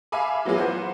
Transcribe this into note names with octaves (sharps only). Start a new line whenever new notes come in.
E5 F5 G#5 B5 D6
E3 F#3 B3 E4 F4 G#4
B4 C5 F#5